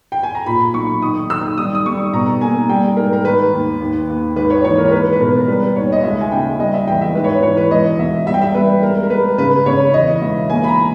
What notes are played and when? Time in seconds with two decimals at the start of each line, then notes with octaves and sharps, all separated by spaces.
0.12 G5
0.23 G#5
0.35 A#5
0.46 A#2 B5
0.74 B1 C#6
1.02 D#3 D#6
1.30 D#3 E6
1.58 G3 D#6
1.75 D#6
1.85 G3 C#6
2.13 B2 A#5
2.41 A#3 G#5
2.69 G3 G5
2.97 G#2 A#4
3.13 A#4
3.25 D#3 B4
3.53 D#2
3.81 D#2
4.09 D#2
4.36 G#1 B4
4.50 C#5
4.64 E3 C#5
4.78 A#4
4.88 A#4
4.92 G#3 B4
5.13 B4
5.20 B2 A#4
5.39 A#4
5.48 G3 B4
5.76 D#2 C#5
5.92 D#5
6.03 C#2 E5
6.20 G#5
6.31 C#3 G5
6.59 G3 D#5
6.73 E5
6.87 E2 G5
7.01 E5
7.15 G#2 B4
7.24 C#5
7.29 B4
7.43 E3 C#5
7.57 B4
7.71 E1 D#5
7.98 E1 E5
8.26 G3 E5
8.34 G5
8.41 E5
8.54 G3 B4
8.82 G#3 A#4
9.03 A#4
9.10 G#3 B4
9.38 C#3 B4
9.66 C#3 C#5
9.94 E2 D#5
10.22 E1 E5
10.50 A#3 G#5
10.64 B5
10.68 A#5